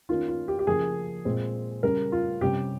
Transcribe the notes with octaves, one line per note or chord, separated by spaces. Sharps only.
D#3 A#3 C#4 F4
F4
G4
G4
C#3 F3 A#3 G#4
A#2 G#3 C4
C#3 G3 C#4 A#4
F4
C3 G3 C#4 G4